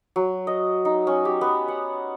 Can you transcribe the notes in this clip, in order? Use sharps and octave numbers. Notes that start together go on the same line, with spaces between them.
F#3
D#5
D#4
C#4
G4
B3
F#5